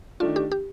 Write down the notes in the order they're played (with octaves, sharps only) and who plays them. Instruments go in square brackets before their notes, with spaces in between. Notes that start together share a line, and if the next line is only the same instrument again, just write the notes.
[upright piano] D#3 A3 D4 [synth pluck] F4
[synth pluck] G4
G4